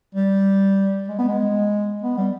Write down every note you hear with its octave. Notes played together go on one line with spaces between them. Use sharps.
G3
G#3
B3
G#3
B3
G3